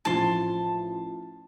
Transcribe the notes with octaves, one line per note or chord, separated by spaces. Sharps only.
A1 F3 A5 C6